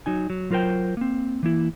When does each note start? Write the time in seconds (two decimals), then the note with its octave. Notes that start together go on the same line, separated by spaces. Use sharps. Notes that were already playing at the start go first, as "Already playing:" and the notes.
0.06 F#3 D#4 G#5
0.30 F#3
0.51 F#3 F4 A#4 C5 G5
0.97 A#3 C4
1.43 E3 A#3 E4